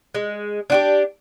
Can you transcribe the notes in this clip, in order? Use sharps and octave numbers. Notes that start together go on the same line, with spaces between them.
G#3
D4 F#4 G4